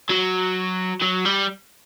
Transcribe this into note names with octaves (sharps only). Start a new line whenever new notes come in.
F#3
F#3
G3